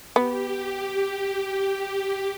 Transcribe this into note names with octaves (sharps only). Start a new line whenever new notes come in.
B3 G4